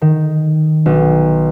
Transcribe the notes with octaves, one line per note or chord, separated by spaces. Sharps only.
D#3
B1